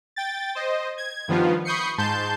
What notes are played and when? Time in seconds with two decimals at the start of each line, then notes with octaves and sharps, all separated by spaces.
0.16 G5 A6
0.55 C5 D#5
0.98 G#6
1.28 G2 D#3 F3 B3 F4
1.65 B5 C#6 D#6 G6 C7 C#7
1.98 G#2 A5 C6 G6